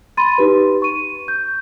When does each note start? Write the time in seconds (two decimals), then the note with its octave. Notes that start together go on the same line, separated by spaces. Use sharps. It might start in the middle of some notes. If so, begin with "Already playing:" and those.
0.17 B5 C6 A6 D#7
0.38 D#4 G4 B4
0.82 C#6 D#7
1.28 G6